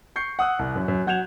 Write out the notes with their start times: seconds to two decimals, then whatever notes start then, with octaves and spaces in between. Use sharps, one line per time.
0.16 C#6 G6 C7 C#7
0.39 F#5 D#6 E6 F#6
0.59 C2
0.76 F#2
0.88 F#2
1.07 F#3 F#5 G6 G#6 E7 F7